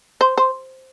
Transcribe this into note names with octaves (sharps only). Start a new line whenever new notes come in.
C5
C5